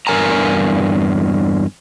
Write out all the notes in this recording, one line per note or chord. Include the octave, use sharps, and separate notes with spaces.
E2 G2 A#4 G#5 A#5